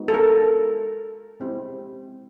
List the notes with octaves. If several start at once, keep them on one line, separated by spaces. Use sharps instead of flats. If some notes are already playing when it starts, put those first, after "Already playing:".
Already playing: G#3 B3 D#4 F#4
A4
A#4
G#3 C4 E4 G4